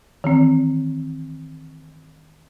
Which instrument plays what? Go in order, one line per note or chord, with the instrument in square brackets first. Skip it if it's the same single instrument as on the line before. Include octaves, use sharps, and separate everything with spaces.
[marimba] D#3 E3 C4